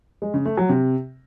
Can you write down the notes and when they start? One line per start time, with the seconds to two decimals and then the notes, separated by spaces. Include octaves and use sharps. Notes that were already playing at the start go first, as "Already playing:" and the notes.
0.22 G#3
0.34 C#3
0.46 A3
0.57 F#3
0.69 C3